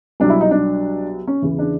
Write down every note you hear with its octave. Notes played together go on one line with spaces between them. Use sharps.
C2 B2 F#3 D4
E4
D#4
D4
C#4
E2 C#3 E3
D4